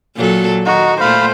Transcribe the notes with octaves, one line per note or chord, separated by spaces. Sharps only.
A#2 F#3 A4
D#3 D#4 F#4
A#2 A3 C5 F5 B5